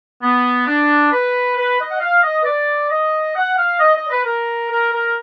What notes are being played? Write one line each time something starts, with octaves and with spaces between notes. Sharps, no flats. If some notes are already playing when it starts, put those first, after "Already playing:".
B3
D4
B4
B4
D#5
F#5
F5
D#5
B4
D5
D#5
F#5
F5
D#5
D#5
D5
B4
A#4
A#4
A#4